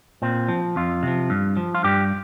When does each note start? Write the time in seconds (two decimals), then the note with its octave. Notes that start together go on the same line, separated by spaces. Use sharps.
0.22 A#2 C4
0.48 F3
0.76 F2 F4
1.03 C3 F3
1.30 G2
1.57 F3
1.75 F4
1.84 G2 G4